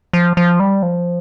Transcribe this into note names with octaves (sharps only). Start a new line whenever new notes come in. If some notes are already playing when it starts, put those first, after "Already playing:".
F3
F3
G3
F3